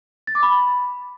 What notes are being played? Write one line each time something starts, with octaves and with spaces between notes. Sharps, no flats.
A6
D6
B5